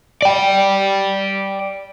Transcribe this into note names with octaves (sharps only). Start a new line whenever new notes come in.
D5 G5